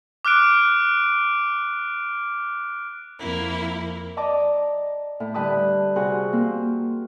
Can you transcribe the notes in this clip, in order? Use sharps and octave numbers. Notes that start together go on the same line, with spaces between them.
D6 F6 F#6 D7
F2 A#3 E4
D5 D#5 A5 A#5 D6 D#6
A2
D3 G3 B4 A5 D#6
C3 F#4 G#4 C5
A#3 C4